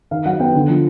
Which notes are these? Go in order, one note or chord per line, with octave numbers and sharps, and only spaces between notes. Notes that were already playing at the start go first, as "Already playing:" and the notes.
D#3 F5
F#3 F#5
B3 G5
D3
F3